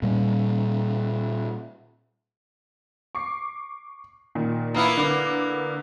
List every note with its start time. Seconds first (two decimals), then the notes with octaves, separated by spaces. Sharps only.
0.02 A#2 G3
3.15 C#6 D6 C7
4.35 A#2 D#3
4.74 A#3 B3 E4
4.97 D3 A#4 D6